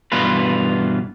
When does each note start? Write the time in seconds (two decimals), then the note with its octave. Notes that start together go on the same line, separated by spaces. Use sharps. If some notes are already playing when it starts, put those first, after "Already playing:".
0.12 G2 B2 E3 F4 B4